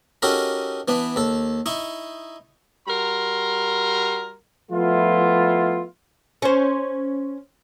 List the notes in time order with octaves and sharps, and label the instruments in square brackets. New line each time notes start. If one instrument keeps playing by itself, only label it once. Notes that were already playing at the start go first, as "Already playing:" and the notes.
[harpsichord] C#4 D#4 F#4 G4 A4 A#4
E3 B3 D4
D#2 A4
D#4 E4 C#6
[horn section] G3 F#4 A#4 A#5 C6
[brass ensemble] F3 A3 B3 E4 F4
[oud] C#4 C5